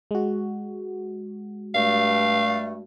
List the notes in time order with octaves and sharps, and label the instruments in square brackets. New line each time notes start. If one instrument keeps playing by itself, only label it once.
[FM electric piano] G#3 F#4
[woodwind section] G2 A3 [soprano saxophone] F5